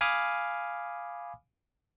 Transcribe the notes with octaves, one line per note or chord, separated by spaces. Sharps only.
F5 G#5 B5 D6 D#6 F6